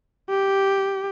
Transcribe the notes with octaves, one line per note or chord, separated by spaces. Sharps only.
G4